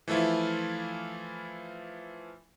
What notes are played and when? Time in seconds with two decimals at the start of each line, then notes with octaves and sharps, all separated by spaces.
0.08 E3 F3 A3 E4 F4